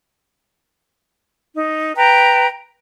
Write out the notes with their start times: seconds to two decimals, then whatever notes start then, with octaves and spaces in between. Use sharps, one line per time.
1.55 D#4
1.97 B4 G5 A#5